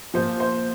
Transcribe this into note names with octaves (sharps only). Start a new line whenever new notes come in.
A#2 F3 C5
C5